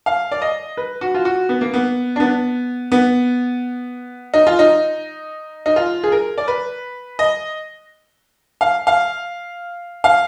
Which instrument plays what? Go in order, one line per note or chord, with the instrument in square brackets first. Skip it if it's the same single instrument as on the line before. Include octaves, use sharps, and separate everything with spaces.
[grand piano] F5
D5
D#5
B4
F#4
F4
F#4
B3
A#3
B3
D4
B3
B3
D#4
F4
D#4
D#4
F4
G#4
A#4
D5
B4
D#5
F5
F5
F5